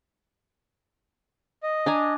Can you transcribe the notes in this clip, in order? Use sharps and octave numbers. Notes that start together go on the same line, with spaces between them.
D#5
D4 G#5 A#5